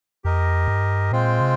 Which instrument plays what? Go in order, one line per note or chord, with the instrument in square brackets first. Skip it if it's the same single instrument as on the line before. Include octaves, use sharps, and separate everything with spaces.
[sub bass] F2 [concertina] G4 A#4 D#5
[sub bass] G2
[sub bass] A#2 [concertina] G#3 C4 F4 C5 G5
[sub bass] C3